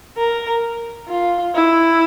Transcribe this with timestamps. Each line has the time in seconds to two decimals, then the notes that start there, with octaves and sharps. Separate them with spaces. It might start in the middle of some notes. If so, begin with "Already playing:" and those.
0.17 A#4
1.09 F4
1.54 E4